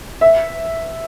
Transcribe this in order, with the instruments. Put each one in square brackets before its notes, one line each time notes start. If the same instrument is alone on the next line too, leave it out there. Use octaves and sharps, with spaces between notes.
[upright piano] E5